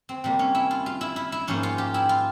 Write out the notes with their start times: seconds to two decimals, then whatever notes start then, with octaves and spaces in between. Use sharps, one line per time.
0.09 C4
0.24 C3 G3 A#3
0.39 C#4
0.55 E4
0.71 F4
0.86 F4
1.01 E4
1.16 E4
1.32 E4
1.48 G#2 F3 A#3 C#4
1.63 F4
1.78 G4
1.94 E4
2.09 F4